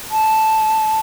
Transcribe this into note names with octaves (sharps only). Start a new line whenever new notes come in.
A5